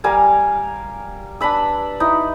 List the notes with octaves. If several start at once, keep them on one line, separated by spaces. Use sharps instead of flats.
G3 A#4 F5 G#5
D4 B4 B5 E6
D#4 E4